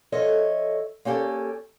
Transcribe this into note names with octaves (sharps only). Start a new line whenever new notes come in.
F3 A4 C#5 D#5 E5
A#3 C#4 G4 A4